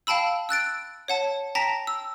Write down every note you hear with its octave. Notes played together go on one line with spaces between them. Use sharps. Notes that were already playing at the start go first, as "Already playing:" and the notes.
F5 G5 A5 B5 E6
E6 F#6 A6 D7
C#5 F#5 A5
G5 A5 A#5 A#6 B6
E6